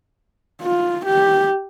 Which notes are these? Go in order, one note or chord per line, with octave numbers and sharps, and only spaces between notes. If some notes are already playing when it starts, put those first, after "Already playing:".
F4
G4